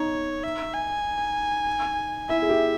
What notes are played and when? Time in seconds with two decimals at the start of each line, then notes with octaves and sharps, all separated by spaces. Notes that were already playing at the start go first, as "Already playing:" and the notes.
Already playing: D#4 C#5
0.44 E5
0.75 G#5
2.29 E4 E5
2.42 G#4
2.49 G4